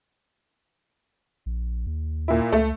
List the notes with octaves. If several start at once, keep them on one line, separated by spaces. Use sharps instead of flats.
A#1
D#2
A#2 E4
C#2 A3